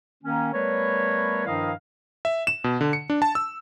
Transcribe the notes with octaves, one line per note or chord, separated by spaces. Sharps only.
D#3 A#3 C#4
G3 A3 B3 A#4 B4 C#5
G2 D#3 F3 E4 D#5 F5
E5
E7
B2
D3
C#7
D4
A5
E6